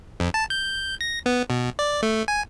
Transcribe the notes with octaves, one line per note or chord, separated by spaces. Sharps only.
F2
A5
G6
A#6
B3
B2
D5
A3
G#5